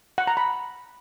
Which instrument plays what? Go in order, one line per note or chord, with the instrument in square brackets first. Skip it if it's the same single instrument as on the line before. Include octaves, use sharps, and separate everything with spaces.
[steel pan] F#5
A#5
B5